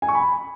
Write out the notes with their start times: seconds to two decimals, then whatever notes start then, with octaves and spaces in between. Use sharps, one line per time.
0.02 G#5
0.08 C#6
0.15 B5